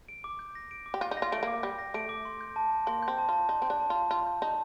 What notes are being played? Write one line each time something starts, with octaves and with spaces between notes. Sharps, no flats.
D7
D6
G6
A#6
D7
D6
G4
F4 G6
D#4
A#6
F4
A3 D7
A#3 D6
G3 G6
A#6
A3 D7
D6
C6
G6
A5
A5
A#3 C6
G6
C4
A5
F4 A5
D#4 C6
C4
G6
D4
A5
F4 A5
F4 C6
G6
D#4 A5